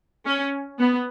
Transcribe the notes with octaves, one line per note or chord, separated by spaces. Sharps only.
C#4
B3